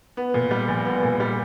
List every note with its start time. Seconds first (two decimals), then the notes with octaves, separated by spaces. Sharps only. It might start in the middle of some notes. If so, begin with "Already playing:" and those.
0.17 B3
0.34 A#2
0.51 G3
0.68 A#1
0.85 B3
1.03 A#2
1.20 G3